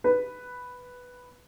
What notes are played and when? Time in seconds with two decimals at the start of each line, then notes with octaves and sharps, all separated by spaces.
0.04 B4